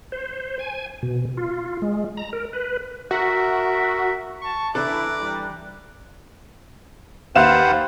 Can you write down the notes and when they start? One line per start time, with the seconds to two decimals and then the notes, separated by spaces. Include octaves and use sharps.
0.12 C5
0.59 G#5
1.03 B2
1.37 F4
1.82 G#3
2.17 A#5
2.33 A#4
2.53 B4
3.11 F#4 A#4 E5
4.41 A5 C#6
4.75 E3 D4 E4 A4 D5 A#5 F#6
5.18 G3
7.35 D#2 B4 C5 F5 F#5 E7